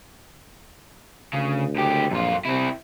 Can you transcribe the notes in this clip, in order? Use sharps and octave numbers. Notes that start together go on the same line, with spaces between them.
D2 C#3
C#2 G4
A#1 F#2 F4
C3 C4 E4